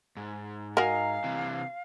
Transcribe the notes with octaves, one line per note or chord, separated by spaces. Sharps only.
G#2
F#4 A#4 D#5 F5 G#5 A#5
C3 E3